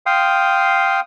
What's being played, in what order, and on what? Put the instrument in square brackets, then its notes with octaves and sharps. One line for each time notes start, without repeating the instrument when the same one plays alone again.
[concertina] F5 G5 C6 D#6